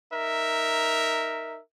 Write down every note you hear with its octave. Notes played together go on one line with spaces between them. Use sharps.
D#4 A#4 E5